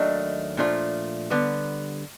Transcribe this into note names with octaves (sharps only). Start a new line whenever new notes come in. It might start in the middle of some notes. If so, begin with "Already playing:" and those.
Already playing: D#2 D#3 F#3 A3 D4
A#2 F3 A3 D4 F4
D3 G3 B3